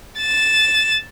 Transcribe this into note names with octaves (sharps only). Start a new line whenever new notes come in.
A6 E7